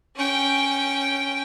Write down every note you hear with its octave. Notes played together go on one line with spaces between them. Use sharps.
C#4 G5